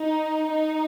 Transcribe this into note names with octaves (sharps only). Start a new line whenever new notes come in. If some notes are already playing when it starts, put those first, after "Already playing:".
Already playing: D#4
D#4